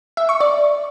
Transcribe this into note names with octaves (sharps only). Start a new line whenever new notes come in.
E5
C#6
D5